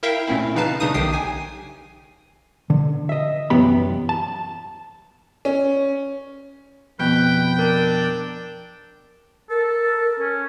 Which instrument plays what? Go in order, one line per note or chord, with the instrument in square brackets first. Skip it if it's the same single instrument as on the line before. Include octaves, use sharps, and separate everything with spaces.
[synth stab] E4 A#4 E5 F5 G5
A#2 A3 C4 C#4 E4
C#3 E3 D#4 B4 F5 A5
C#3 A3 D4 D#4 D#6 D#7
B1 D#3 G4 G5 D#6 C7
G#5
[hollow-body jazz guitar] D3
D#5 E5
C2 F#2 E3 B3 G4 B5
A5
[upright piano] C#4
[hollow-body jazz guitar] F2 B2 [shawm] B4 [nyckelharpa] G5
[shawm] D4 [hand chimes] A#4
[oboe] A4 [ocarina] A#4
[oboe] C#4